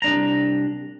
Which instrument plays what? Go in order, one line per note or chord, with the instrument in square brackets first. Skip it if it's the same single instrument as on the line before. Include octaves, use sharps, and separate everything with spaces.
[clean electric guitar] C2 D4 A#5